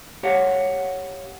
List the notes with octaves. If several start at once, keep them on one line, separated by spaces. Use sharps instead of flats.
G4 C#5 F5 F#5